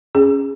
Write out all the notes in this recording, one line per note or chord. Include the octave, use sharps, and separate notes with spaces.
C#4 G#4